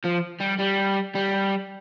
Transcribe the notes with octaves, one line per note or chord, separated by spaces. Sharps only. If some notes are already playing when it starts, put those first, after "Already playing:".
F3
G3
G3
G3